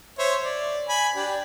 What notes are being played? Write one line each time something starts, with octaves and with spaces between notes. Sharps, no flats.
C5 C#5 E5
D5
G#5 B5
D4 G4